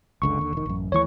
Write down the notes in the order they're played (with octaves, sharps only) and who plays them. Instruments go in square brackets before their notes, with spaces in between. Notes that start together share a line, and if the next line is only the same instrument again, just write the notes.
[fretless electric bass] F#1 C#2 D3 [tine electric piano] C#6
[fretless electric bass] D#2 D3
E1 D#3
A1 F#2
[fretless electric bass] D#2 E3 A3 [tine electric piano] C#5 C#6